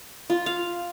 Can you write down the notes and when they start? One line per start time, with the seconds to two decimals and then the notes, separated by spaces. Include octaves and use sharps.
0.30 F4
0.46 F5